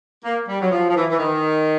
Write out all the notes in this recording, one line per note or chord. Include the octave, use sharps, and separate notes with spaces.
A#3
G3
F#3
F3
F3
E3
E3
D#3